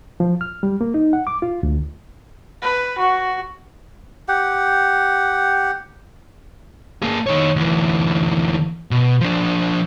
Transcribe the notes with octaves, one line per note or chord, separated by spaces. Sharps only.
F3
F6
G3
A#3
D#4
F#5
D6
F4
D2
B4
F#4
G4 F#5
A#3 G#4
D#3 C#5
D2 E3
B2
F3 D4